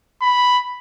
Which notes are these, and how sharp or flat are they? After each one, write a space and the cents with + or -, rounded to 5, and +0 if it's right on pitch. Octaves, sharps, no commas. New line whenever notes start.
B5 +0